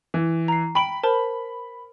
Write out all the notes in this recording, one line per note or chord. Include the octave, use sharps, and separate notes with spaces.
E3
A#5 C7
G5 B5 D7 F#7
A#4 C5 A5